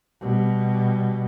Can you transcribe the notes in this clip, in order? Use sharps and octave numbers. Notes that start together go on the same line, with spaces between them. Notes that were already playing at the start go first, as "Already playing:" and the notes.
B2 G3